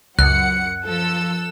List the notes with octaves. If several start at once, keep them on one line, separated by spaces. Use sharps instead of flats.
C#2 F#2 F#5 F#6 C#7
F3 A4 E6